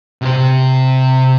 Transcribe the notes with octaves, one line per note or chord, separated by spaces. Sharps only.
C3 C5